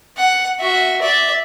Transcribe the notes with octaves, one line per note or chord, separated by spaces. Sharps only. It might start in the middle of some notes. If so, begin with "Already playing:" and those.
F#5
F#4 E5
D5 E5